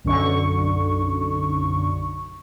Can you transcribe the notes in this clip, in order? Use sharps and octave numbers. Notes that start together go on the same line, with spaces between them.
B1 F#2 D3 C#6